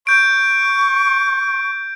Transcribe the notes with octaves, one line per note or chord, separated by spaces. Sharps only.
C#6 G6 D7